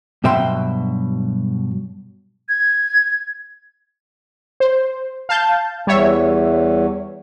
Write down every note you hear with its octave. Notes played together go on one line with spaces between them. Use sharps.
G2 B2 F#3 E5 G5 C6
G#6
C5
F5 A5 G6
E2 G3 C#5 E5